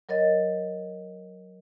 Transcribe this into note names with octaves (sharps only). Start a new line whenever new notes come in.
F#3 A#4 C#5 D#5 A6